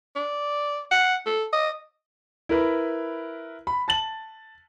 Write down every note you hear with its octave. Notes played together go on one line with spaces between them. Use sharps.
D5
F#5
A4
D#5
E4 A#4 B4
B5
A5 A6 F#7